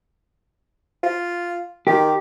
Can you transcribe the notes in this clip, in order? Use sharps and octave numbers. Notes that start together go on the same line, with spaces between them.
F4
D#3 G4